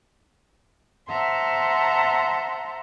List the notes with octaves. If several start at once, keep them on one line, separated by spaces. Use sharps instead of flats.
C5 E5 F#5 A5 A#5 C6